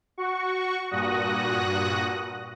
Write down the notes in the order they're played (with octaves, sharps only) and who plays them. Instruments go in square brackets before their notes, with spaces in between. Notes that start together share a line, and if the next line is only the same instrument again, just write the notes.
[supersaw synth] F#4 C#6
G2 A#2 F#4 D#6 F#6 A#6